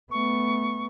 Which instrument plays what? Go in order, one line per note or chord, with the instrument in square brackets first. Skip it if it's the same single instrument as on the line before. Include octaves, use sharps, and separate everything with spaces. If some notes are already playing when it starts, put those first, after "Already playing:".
[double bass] A3 B3 [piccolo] C#6